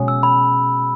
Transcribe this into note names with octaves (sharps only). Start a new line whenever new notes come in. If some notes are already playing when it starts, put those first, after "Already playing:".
Already playing: B2 G#3 C#4
E6
B5